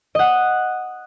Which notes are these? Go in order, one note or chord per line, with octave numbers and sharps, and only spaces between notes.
D#5 F#5